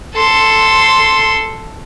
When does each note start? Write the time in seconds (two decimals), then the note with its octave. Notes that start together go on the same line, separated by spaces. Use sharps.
0.15 A4 C6